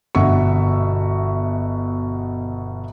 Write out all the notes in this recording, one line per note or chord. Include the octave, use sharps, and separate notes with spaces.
G1 B2 F#4 E5 C#6